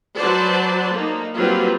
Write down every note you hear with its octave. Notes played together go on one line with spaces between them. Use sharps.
F#3 B4 C5 D5 A5
A#3 D#4
F#3 G3 A#3 C4 F4 B4